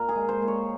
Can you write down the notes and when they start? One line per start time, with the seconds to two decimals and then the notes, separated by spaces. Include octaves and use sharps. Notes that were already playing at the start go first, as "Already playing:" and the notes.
Already playing: A#2 A#4
0.09 G#4
0.15 G#3
0.29 C5
0.42 A#2
0.48 C#5